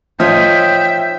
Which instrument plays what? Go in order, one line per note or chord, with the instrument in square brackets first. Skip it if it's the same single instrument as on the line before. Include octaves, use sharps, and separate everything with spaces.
[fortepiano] F3 [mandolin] D#4 C#5 D#5 [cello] E5 [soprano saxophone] G5